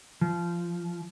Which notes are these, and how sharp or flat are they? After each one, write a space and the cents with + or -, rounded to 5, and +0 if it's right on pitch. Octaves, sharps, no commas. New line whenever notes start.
F3 -20